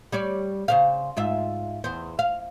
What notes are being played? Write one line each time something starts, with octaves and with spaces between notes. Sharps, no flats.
G3 C#5 D5
C#3 C5 F5
G#2 F4 E5
E2 C5
F5